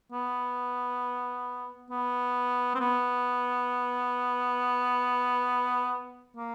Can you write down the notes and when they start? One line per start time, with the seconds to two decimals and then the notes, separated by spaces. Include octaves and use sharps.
0.12 B3
1.91 B3
2.75 C4
2.80 B3
6.36 A#3